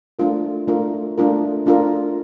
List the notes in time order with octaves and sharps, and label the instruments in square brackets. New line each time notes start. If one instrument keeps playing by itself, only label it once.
[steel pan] A3 D4 F4 A#4
A3 D4 F4 A#4
A3 D4 F4 A#4
A3 D4 F4 A#4